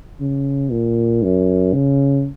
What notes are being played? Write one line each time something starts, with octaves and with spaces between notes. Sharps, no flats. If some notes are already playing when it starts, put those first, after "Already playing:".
C#3
A#2
F#2
C#3